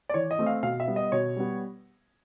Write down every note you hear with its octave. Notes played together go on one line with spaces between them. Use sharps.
D5
E3 C#5
D#5
A3 C4
F5
B2 F5
E5
G3 B3
D#5
B2 C#5
G3 B3